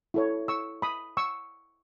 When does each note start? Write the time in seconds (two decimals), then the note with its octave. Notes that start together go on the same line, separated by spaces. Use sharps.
0.14 E4 A4 C#5
0.48 C#6 E6
0.82 B5 D#6
1.17 C#6 E6